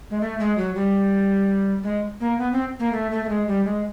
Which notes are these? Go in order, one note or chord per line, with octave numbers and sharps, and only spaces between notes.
G#3
A3
G#3
F#3
G3
G#3
A#3
B3
C4
A#3
A3
A3
A3
G#3
G3
G#3